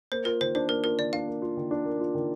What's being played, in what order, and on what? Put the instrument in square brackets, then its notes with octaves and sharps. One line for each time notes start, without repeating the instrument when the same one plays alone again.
[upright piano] A#3 [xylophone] C5
[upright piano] F4 [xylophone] A#4
[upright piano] D#3 [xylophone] C5
[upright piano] D4 [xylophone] C5
[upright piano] A#3 [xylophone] A#4
[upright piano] F4 [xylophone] A#4
[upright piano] D#3 [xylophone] D5
[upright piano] D4 [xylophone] F5
[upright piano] A#3
F4
D#3
D4
A#3
F4
D#3